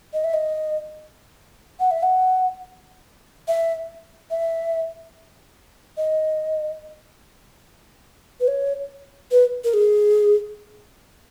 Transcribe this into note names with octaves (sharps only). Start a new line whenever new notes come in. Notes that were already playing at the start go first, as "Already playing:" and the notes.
D#5
E5
D#5
F#5
E5
F#5
E5
E5
D#5
B4
C#5
B4
A#4
G#4